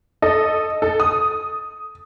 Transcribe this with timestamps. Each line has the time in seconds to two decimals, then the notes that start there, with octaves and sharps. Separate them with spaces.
0.22 A4 D#5
0.82 A4
1.00 D#6